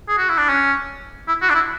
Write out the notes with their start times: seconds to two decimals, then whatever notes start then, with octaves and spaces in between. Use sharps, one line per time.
0.08 G#4
0.18 F#4
0.29 E4
0.38 D4
0.49 C#4
1.28 E4
1.42 F#4
1.50 D4
1.55 E4